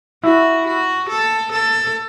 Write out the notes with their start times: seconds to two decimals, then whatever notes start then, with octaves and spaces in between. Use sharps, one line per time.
0.24 E4 F#4
0.67 F#4
1.09 A4
1.52 A4